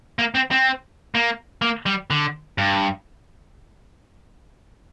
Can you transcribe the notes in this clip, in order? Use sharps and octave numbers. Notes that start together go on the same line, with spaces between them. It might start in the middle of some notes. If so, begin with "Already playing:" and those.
A#3
C4
C4
A#3
A#3
G3
D3
G2